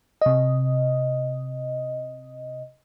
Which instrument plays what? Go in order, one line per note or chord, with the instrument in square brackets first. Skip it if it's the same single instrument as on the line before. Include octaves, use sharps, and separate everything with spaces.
[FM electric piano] C3 D#5